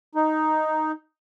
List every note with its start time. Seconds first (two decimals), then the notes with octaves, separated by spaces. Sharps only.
0.15 D#4